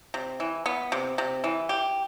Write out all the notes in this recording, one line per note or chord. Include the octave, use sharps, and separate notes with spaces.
C3
E3
B3
C3
C3
E3
G4